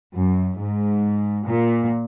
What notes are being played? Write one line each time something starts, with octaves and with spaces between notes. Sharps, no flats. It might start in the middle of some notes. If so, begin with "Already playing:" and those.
F#2
G#2
A#2